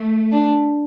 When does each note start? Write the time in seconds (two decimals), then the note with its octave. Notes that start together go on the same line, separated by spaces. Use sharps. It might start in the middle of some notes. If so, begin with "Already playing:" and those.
Already playing: A3
0.32 D4